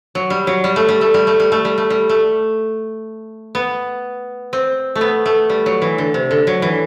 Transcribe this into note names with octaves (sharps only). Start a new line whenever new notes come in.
F#3
G3
F#3
G3
A3
G3
A3
G3
A3
G3
A3
G3
A3
G3
A3
B3
C4
A3
B3
A3
G3
F#3
E3
D3
C3
D3
F#3
E3